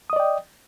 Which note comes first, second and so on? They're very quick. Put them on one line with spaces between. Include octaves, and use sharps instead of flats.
D#6 D#5 D5 G5